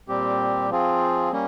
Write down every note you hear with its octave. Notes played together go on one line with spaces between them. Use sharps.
A#2 G3 C4 G4
F3 C4 F4 G#4
G3 A#3 C#4